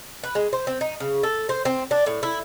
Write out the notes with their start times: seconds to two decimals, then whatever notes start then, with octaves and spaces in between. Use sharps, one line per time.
0.23 B4
0.35 G#3
0.53 C5
0.67 C4
0.81 D#4
1.00 C#3
1.23 A4
1.49 C5
1.65 C4
1.91 D4
2.06 A2
2.23 E4